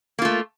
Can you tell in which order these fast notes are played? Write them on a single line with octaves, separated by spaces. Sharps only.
A#3 F4 A3